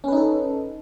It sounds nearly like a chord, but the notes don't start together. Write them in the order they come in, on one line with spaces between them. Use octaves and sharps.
C#4 B4 D#4 A4